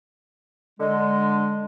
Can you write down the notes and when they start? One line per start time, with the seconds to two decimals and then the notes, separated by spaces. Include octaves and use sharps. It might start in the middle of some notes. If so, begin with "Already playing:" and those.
0.80 D3 G#3